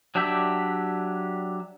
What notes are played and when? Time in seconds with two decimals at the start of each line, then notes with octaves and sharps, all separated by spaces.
0.15 F#3 D4 G4 E5 G6